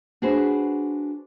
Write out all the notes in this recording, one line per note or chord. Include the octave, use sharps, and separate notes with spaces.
D4 F#4 G#4 B4 C5